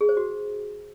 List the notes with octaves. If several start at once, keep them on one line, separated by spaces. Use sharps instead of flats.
G#4
C5
F#4